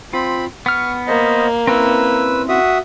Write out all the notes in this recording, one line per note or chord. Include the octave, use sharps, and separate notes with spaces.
C4 F4 B5
B3 C#6 F6
A#3 C5 D#5
C4 C#4 E4 B4 E6
F#4 E5 D#6